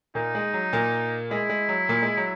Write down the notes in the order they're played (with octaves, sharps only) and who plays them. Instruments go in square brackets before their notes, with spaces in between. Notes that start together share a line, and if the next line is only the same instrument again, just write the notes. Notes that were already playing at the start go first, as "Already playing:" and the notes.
[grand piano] A#2 A#3 [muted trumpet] D#4
[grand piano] G#3
F#3
A#2 A#3
[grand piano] G#3 [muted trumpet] E4
[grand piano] G#3
F#3
A#2 A#3
G#3
F#3